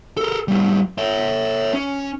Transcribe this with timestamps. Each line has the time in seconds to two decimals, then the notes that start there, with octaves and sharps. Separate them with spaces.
0.17 A4 A#4
0.48 A2 G3
0.98 C#5 E5
1.74 C#4